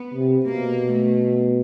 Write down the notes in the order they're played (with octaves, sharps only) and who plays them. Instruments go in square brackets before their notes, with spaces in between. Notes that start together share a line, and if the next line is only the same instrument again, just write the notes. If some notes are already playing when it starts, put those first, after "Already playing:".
Already playing: [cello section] B3
[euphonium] C3
[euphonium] B2 [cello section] A#3
[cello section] A3